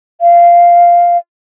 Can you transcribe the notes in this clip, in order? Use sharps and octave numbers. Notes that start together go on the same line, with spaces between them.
F5